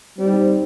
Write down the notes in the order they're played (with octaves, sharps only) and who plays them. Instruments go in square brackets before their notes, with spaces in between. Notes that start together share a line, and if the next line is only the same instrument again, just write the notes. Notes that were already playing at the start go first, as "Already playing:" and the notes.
[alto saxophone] G3 [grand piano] C4
[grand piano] D#4
C4